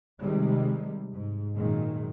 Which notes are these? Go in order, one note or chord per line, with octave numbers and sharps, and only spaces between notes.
C3 D#3 G3 G#3
G#2
F#2 A#2 D#3 G#3